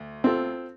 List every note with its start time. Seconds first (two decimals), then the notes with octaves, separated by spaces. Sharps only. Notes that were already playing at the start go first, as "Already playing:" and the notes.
Already playing: D2
0.24 C4 F4 A4